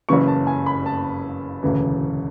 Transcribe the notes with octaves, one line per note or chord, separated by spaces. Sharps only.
F#1 F#2 C#3 E3 C#6
A5
G#5
B5
A5
E1 D2 C#3 E3